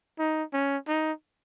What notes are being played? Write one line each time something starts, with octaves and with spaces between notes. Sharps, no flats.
D#4
C#4
D#4